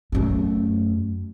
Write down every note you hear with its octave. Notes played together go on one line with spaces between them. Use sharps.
F#2 A3